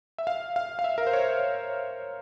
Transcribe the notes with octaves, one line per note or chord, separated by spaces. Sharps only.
E5
F5
F5
F5
E5
A#4
C5
C#5